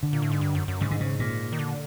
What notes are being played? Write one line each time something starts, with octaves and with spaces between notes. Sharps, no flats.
D3
A#2
A2
G#2
G2
F#2
F#2
G#2 C#3
D3
C#3
A#2
D#3
D3